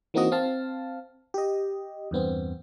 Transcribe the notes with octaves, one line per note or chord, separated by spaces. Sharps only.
E3 A#3 C4 D#4 F#4 D#5
C4 F5 A5
G4 D#5
E2 G2 B3 C4